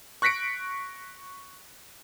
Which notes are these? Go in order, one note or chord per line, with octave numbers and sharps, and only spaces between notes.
C#6 F#6 A#6 B6 C#7 D7